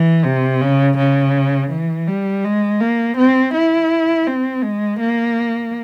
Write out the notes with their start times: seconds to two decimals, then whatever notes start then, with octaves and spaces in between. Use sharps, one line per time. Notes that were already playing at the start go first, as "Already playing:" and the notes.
Already playing: E3
0.25 C3
0.61 C#3
0.98 C#3
1.70 E3
2.08 G3
2.45 G#3
2.80 A#3
3.17 C4
3.54 E4
4.27 C4
4.63 G#3
5.00 A#3